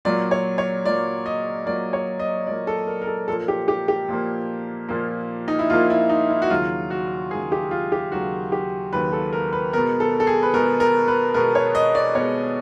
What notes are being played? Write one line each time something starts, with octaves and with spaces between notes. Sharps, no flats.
A#2 F#3 A#3 D5
C#5
C#5
A#2 F#3 A#3 D5
D#5
A#2 F#3 A#3 D5
C#5
D#5
A#2 F#3 A#3 D5
A4
A#4
A#4
A4
A#2 F3 A#3 A4
G4
G4
G4
A#2 F3 A#3
A#2 F3 A#3
D#4
E4
A#2 F3 A#3 F4
E4
D#4
E4
F#4
D#2 C#3 F#3 F4
F#4
D#2 C#3 F#3 G#4
G4
F4
G4
D#2 C#3 F#3 F#4
G4
D#2 C#3 F#3 B4
A4
A#4
B4
B2 G#3 B3 A#4
A4
A4
G#4
B4
B2 G#3 B3 A#4
A#4
B4
B2 G#3 B3 A#4
C#5
D#5
D5
B2 G#3 B3 C#5